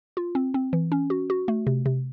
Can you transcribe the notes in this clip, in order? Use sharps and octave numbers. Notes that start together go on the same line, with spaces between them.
F4
C4
C4
E3
C#4
F#4
F#4
A3
C3
C3